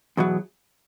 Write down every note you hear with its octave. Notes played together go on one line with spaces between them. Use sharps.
E2 B2 F#3